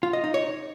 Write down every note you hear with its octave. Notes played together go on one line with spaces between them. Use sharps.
F4
D#5
D#4
C#5